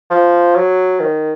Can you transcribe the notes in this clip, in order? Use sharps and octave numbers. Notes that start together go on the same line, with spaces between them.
F3
F#3
D#3